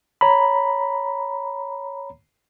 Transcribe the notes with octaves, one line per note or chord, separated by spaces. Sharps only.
C#5 A#5 B5